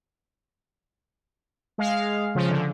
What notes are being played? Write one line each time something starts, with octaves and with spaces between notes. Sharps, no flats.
G#3 F5
C#3 F3
D3